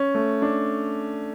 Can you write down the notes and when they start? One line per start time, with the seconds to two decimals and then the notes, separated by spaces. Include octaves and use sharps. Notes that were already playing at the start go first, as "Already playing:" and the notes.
Already playing: C#4
0.15 A3
0.42 D4